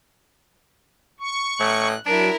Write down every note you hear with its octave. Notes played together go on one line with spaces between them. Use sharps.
C#6
A2 F#6
F#3 D4 E4 A#4